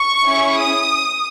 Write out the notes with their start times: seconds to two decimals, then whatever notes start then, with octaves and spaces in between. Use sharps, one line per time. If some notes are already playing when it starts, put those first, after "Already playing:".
Already playing: C#6
0.24 C#4 E4 G#4
0.56 D#6